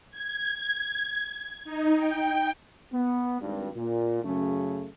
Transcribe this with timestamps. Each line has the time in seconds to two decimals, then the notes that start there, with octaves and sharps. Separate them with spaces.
0.10 G#6
1.64 D#4
1.96 G5
2.93 B3
3.41 G#1 G2
3.75 A#2
4.24 F#2 C#3 A3